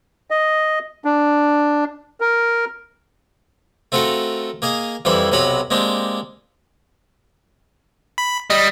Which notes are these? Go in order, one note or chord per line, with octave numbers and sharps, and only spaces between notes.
D#5
D4
A#4
A3 C4 F4 F#4 A4 A#4
A#3 G#4 D#5 F5
F2 E3 G3 E4 C5 G5
B1 C3 F#3 B4 A#5 B5
G#3 A#3 C4 D4 G4
B5
G3 D#5